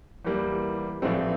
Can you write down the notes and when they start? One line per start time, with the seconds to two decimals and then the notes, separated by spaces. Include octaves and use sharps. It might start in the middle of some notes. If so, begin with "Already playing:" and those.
0.25 E2 E3 G3 A#3
1.02 A#1 A2 E3 A3 C4